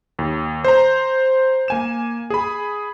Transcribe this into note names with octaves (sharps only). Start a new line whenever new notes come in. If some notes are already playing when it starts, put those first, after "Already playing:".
D#2
C5 A#5
A#3 G#5 E7
G#4 B5